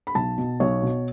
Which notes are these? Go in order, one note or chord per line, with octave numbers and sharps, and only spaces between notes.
B5
B1 A5
B2
B1 C#5
B2